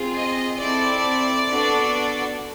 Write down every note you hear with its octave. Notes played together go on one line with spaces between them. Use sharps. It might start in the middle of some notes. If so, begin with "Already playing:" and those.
Already playing: C4 F4 G#4
D#5
C4 E4 A4 D5
B3 D4 F#4 A4